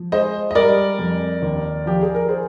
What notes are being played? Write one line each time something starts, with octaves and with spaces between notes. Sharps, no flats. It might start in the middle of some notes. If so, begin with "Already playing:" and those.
Already playing: F3
G#3 C5 D#5
D#5
G3 A#4 D5
F2
D#2
F3 G4
G#4
A#4
G#4 C5